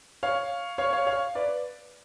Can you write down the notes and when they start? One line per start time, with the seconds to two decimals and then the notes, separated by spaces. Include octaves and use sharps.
0.23 C#5 F5
0.78 C#5 F5
0.93 C#5 F5
1.07 C#5 F5
1.35 B4 D5